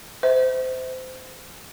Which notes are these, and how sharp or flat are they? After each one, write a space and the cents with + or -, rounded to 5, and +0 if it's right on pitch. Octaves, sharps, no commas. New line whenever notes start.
C5 -25 E5 -35